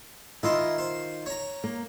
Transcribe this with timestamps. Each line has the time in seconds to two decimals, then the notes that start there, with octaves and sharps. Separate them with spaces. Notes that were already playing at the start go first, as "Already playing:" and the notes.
0.43 D#3 E4 F4 D#5 C6
0.78 C5
1.26 C#5 A#5
1.64 A#3